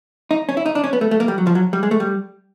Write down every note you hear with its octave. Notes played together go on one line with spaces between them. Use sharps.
D#4
C#4
E4
D#4
D4
C#4
B3
A3
A3
A#3
G3
F#3
F3
F#3
G3
G#3
A3
G3